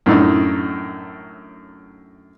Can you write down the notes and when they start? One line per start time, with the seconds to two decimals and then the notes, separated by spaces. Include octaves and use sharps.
0.06 F#2 A2 A3 D4 D#4